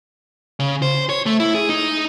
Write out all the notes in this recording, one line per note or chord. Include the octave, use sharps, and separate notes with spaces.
C#3
C5
C#5
A3
E4
G#4
D#4